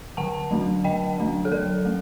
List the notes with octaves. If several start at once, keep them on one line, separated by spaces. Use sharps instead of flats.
D3 F#5 A5
F#3 A3 D4
D3 D#5 G5
F#3 A3 D4
A4
F#3 A#4
A3